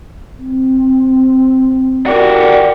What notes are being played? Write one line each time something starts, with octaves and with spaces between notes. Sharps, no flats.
C4
F#4 G4 A#4 D5